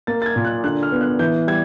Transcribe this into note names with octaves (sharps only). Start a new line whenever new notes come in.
A#3 A6
A6
G#6
A#2
F#6
D3 F#6
F6
B3
F#6
E3 G6
G3 G#6